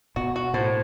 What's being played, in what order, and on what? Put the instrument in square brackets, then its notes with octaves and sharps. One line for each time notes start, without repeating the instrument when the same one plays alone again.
[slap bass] B2 [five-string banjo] F#4
[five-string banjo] F#4
[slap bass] A2 [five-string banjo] C5